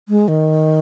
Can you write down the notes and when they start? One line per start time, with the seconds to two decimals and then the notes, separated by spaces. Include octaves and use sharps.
0.09 G#3
0.28 D#3